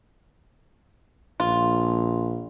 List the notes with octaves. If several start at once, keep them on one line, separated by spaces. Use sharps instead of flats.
A#1 F4